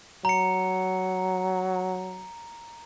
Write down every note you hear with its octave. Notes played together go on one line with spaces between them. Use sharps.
F#3 A#5 C#7